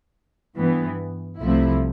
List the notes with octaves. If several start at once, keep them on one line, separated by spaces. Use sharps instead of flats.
G2 E3 B3
C2 C3 F3 A3 E4